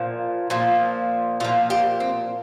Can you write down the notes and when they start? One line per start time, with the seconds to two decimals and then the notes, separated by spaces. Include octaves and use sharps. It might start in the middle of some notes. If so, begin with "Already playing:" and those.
Already playing: A#2 F3
0.50 A#2 F3
1.40 A#2 F4
1.44 F3
1.70 G4
2.00 C4